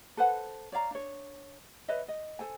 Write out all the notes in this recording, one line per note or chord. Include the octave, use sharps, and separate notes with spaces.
A4 B4 C5 F#5
C#5 D5 F5 A#5
D4 C#5
B4 C#5 D#5 E5
D#5
A4 C5 G#5